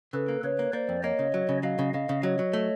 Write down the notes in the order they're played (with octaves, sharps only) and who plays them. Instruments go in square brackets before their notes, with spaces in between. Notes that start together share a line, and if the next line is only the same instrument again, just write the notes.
[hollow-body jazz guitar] C#3 [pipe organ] A4 B4
[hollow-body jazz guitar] A#3
[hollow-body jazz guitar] C#3 [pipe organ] B4 C#5
[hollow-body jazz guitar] A#3
[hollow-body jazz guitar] A#3 [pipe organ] C5 D5
[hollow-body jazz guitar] F2
[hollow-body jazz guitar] A#3 [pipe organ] C#5 D#5
[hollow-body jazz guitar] C#3
F#3
C#3
[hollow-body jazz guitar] F#3 [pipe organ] D#5 F5
[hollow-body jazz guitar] C#3
[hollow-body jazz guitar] C#3 [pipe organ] D#5 F5
[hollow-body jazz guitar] C#3
[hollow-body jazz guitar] F#3 [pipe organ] C#5 D#5
[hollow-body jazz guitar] F#3
A3